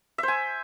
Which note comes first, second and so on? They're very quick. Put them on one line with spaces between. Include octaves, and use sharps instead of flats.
E5 C5 G#5